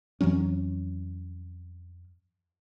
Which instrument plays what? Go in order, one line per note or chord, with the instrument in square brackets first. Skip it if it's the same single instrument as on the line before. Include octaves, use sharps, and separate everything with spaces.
[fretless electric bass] F2 E3 F#3 C#4